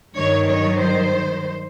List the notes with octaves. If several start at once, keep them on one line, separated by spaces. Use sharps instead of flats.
G2 D#3 F#3 C#5
C#5
C5